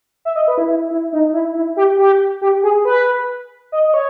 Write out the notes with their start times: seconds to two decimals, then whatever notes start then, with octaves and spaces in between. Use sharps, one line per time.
0.25 E5
0.36 D#5
0.48 B4
0.58 E4
0.69 E4
0.91 E4
1.13 D#4
1.33 E4
1.55 E4
1.77 G4
1.98 G4
2.41 G4
2.63 G#4
2.85 B4
3.72 D#5
3.88 D#5
3.94 C#5